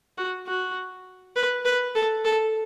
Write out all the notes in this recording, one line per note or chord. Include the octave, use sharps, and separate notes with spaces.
F#4
F#4
B4
B4
A4
A4